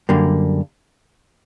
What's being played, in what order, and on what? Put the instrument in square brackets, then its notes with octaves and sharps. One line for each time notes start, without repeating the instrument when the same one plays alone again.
[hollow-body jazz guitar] F#2 D3 G3 A#3